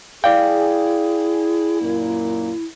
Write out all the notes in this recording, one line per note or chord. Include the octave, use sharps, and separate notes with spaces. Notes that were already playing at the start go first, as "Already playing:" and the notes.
E4 G#4 D5 F5 G5
F#2 A#2 A#3